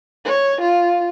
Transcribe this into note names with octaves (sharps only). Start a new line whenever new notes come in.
C#5
F4